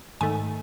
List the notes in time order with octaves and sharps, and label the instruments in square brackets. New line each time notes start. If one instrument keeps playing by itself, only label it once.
[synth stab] G#2 D#3 A3 [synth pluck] G#5